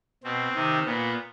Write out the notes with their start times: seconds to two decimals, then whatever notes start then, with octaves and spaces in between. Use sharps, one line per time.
0.24 B2 C4
0.54 C3 D#3
0.85 A#2 B3